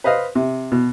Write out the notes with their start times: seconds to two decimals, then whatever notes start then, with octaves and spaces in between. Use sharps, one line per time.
0.04 B4 C5 D#5 F5
0.35 C3
0.72 B2